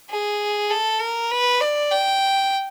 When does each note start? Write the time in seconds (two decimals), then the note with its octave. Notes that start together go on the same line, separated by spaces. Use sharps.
0.10 G#4
0.70 A4
1.01 A#4
1.31 B4
1.61 D5
1.91 G5